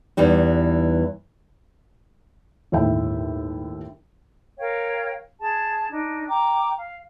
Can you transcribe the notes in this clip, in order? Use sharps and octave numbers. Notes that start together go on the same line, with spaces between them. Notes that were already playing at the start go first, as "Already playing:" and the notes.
E2 E3 G3 D#4
G1 D#2 A2 E4 E5 G5
A#4 C#5 F5 G5
G#4 A5
D4 D#4
G5 A#5 D6
F5